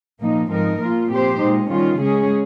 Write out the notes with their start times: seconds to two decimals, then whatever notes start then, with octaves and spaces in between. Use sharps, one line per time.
0.21 A#2 F3 A#3 D#4
0.50 G#2 F3 C4 D#4 A#4
0.81 A#2 F3 A#3 F4
1.11 F3 C4 G4 C5
1.41 A#2 G#3 D#4
1.70 D#3 G3 C#4 F4
2.00 C#3 G#3 C#4 G#4